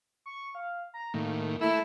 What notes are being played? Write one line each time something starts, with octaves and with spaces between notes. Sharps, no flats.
C#6
F5
A#5
A2 D#3 A#3
A3 E4 E6